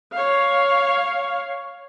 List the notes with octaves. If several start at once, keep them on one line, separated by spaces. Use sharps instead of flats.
C#5 F5